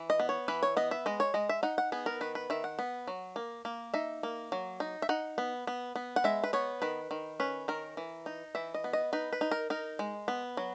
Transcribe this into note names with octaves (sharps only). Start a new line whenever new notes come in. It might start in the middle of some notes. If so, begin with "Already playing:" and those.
Already playing: E3
D#5
B3
C#5
E3 B4
C#5
B3 D#5
E5
G#3 D#5
C#5
G#3 D#5
E5
D#4 F#5
F#5
B3 G#4
A#4
D#3 B4
B4
D#3 E5
F#5
B3
F#3
A#3
A#3
D#4 E5
A#3
F#3
D#4
E5
D#4 F#5
B3
B3
B3
F#5
G#3 E5
B4
B3 C#5
D#3 B4
D#3
C#4 B4
D#3 A#4
E3
D#4
E3 E5
D#5
B3
D#5
D#4 B4
B4
D#4
A#4
D#4 A#4
G#3
B3
F#3